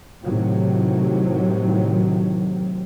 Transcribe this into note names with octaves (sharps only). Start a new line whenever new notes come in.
A2 C3 D#3 F#3